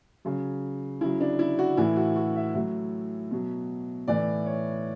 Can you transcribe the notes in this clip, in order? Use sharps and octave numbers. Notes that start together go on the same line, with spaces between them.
C#3 F#3
C#3 F#3 E4
D4
E4
F#4
A2 E3 E4
F#4
F#4
E5
A2 F#3
B2 F#3
A2 E3 D5
C#5